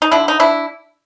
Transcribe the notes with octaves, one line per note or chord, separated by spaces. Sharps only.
D#4
D3 D4 E4
D#4
D4 E4